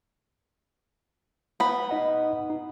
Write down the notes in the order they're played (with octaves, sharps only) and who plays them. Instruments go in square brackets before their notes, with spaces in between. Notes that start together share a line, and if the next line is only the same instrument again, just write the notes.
[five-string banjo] B3 B5
[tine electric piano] D#4 D#5 F#5
D#4